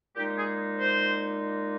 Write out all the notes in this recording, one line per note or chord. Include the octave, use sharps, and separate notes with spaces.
A#2 G#3 D#4 G4
G#4
C5